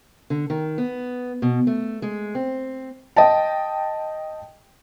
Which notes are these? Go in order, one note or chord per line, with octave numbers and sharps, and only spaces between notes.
D3
D#3
B3
B2
A3
G#3
C4
D#5 G5 A5